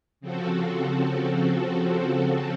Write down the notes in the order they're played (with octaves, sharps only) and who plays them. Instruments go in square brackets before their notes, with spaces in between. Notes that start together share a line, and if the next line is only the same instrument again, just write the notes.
[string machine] C#3 F3 C4 F#4 A4